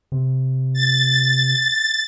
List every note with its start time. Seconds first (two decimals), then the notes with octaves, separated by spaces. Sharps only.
0.12 C3
0.74 A6